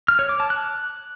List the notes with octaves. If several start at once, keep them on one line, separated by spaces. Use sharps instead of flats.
F6
C#5
D6
A5
F#6